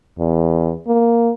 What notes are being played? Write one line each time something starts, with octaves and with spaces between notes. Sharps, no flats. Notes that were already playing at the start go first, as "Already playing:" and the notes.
E2
A#3